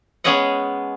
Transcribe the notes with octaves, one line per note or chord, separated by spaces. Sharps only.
G#3 B3 C#4 G#4 D#5 F#5